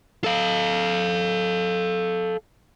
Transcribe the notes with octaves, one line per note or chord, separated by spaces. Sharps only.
A4 F5